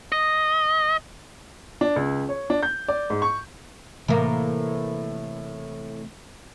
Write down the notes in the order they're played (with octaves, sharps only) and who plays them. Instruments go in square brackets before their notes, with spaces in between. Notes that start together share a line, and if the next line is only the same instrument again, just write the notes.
[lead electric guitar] D#5
[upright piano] D4
C#2
C#5
D4
G6
D5
G#2
C#6
[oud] A2 A#3 [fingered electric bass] C3 E3 A3